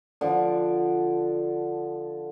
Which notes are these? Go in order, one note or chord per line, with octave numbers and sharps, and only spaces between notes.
D3 F3